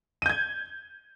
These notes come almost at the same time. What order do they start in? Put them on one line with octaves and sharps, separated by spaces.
D#7 G6 G#6